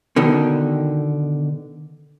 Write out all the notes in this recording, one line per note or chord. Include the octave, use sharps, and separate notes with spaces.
B2 D3 D#3